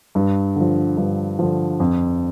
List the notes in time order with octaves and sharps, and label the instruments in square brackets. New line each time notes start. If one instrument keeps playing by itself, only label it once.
[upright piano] G2
D3 F3
G2
D3 F3
F2